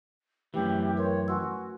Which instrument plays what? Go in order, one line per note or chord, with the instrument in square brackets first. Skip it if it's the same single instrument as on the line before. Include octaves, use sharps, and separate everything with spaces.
[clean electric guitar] F#2 E3 [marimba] A3 [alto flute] G4
[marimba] A#4 B4 C6 [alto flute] C#5
[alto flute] F#4 [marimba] G#5 C6 E6